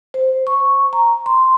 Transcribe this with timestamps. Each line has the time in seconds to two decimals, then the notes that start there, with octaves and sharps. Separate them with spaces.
0.14 C5
0.47 C#6
0.93 A#5
1.26 C6